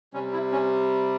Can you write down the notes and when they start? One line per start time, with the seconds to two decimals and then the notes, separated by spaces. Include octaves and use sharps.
0.14 C3 G3 C#4
0.33 E4
0.52 C#4